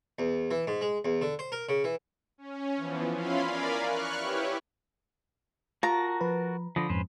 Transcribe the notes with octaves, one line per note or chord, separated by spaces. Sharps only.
E2
E3
G#2
G#3
E2
D3
C5
A#4
C#3
E3
C#4
E3 F3 B3
C#4 E4 F4 F5 B5 C6
A#4 D5 F5 G#5 B5
C#6 F6 F#6
E4 G4 B4 C#5
F4 F#4 A#4 A5 A#5
F3 B4
D3 F3 B5 D#6 A#6
F2 G#2 C#4 B4 C5